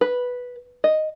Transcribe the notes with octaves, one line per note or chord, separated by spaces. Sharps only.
B4
D#5